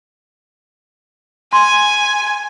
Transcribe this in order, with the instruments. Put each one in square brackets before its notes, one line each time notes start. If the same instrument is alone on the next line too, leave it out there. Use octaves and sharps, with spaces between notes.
[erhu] G#5 [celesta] C6